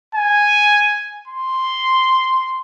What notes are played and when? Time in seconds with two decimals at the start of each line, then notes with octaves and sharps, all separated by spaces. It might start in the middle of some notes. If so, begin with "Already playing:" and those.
0.15 G#5
1.28 C6